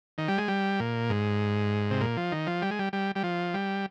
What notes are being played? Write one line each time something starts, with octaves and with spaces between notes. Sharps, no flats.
D#3
G3
G#3
G3
A#2
G#2
C3
A#2
F3
D#3
F3
G3
G#3
G3
G3
G3
F3
G3